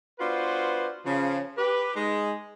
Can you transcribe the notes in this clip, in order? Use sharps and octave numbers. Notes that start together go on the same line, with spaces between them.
B3 D4 F4 F#4 B4 C5
C#3 F3
G4 B4
G#3 D#4